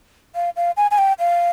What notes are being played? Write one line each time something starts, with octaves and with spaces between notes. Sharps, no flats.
F5
F5
G#5
G#5
G5
F5